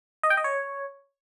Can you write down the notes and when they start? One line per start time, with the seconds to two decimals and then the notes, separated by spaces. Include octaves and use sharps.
0.23 D#5
0.30 G5
0.37 D#5
0.44 C#5